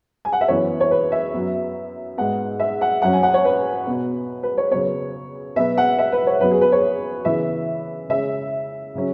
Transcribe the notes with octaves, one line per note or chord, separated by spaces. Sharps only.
G#5
F#5
E5
F#2 E3 B3 C#5
C#5
B4
E5
F#2 F#3 B3
G#2 G#3 B3 F#5
E5
F#5
F#2 F#3 C#4 F#5
G#5
F#5
C#5
B4
B2 B3
B4
C#5
C#3 F#3 B3 C#5
B2 F#3 B3 E5
F#5
E5
B4
C#5
F#2 F#3 B3 B4
G#4
B4
C#5
C#3 E3 B3 E5
C#3 G#3 C#4 E5
C#3 F#3 C#4